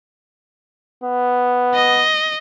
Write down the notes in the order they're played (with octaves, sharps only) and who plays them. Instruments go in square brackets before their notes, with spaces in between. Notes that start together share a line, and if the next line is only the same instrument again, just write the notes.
[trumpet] B3
[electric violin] D#5